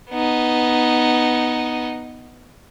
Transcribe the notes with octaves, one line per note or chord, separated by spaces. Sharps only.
B3 D#4